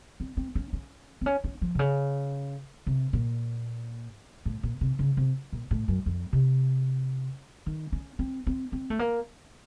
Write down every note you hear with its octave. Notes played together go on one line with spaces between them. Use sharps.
C4
C4
C#4
C#4
C4
C#4
C#4
F3
C3
C#3
C3
A#2
A2
A#2
C3
C#3
C3
A#2
A2
F#2
F2
C3
D#3
C#4
C4
C4
C4
A3
A#3